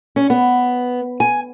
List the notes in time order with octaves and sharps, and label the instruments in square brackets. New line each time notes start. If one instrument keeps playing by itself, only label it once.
[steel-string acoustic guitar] C#4
B3
G#5